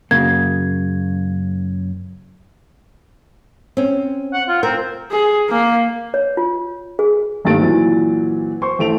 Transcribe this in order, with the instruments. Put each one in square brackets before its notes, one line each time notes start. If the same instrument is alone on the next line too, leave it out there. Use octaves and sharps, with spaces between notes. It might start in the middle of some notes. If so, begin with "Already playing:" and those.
[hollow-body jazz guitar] F#2 C#3 A#3 [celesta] G#6
[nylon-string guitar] C4 C#4
[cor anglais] F#5
F4
[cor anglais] C4 [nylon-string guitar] A#4
[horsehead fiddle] G#4
A#3
[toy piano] C#5
F4
G#4
[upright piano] G#1 G2 A3 A#3 A6 D7
A#2 E3 F#3 C4
C5 C6 C#6
A1 A3 D7 F7